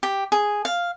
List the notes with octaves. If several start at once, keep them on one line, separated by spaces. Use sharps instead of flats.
G4
G#4
F5